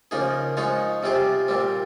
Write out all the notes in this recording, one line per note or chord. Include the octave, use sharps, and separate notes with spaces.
C#3 F3 A#3 D#4 G#4
F3 G#3 D#4 G#4 C#5
C3 G3 C4 F4 G#4
A#2 G3 C4